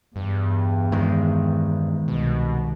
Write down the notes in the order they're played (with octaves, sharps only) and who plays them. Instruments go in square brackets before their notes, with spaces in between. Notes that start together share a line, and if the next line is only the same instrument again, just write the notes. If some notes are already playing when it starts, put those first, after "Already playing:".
[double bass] E2 [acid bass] G2
[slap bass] D#3 G#3
[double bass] C2 [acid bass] B2